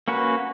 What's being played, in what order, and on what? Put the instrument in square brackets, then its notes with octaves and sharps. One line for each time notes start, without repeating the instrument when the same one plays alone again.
[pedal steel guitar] A#3 C#4 F#4 B4